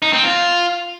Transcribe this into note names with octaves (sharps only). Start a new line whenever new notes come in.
D#4
C4
F4